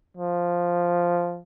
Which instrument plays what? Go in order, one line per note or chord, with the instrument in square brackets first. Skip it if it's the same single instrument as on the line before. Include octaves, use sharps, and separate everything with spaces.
[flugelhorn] F3